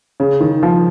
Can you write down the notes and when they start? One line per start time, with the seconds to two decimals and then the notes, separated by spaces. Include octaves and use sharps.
0.20 C#3
0.41 D#3
0.63 F3